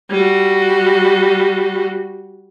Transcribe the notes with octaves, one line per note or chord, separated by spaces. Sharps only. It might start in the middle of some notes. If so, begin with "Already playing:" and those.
G3 F#4